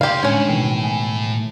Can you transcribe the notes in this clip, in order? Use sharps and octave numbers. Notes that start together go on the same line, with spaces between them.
D2 G4 F5 C6
A2 D3 G3 G#3 C#4 D4 C#5
B2 D#3 E3 G5
G#5